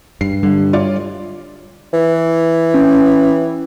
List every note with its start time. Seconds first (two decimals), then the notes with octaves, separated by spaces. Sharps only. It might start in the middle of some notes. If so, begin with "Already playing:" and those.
0.21 G2 C7
0.43 D3 G3
0.73 F4 C#5 D5
1.94 E3
2.74 C#4